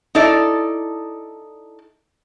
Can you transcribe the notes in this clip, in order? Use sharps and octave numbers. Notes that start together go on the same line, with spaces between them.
D#4 E4 A4 D5